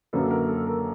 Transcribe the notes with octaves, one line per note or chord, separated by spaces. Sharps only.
F#2 D3 F#3 A#3 C#4 A4 B4
A#4
A4
A#4